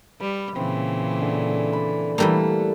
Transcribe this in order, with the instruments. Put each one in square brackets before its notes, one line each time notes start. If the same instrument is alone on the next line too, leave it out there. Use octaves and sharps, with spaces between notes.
[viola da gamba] G3 [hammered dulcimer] B4
[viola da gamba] A#2 C#3 E3 [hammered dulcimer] C4
[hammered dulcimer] D3
D5 B5
[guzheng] E3 G3 A#3 [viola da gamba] A3 [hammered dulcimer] A4 F#5